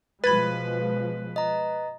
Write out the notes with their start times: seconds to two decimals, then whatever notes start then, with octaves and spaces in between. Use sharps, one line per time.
0.24 B2 F3 G#3 B4 B5 G#6 A6
1.36 D#5 A#5